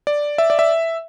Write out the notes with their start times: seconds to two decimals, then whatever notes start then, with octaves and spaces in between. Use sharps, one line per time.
0.07 D5
0.38 E5
0.50 D5
0.59 E5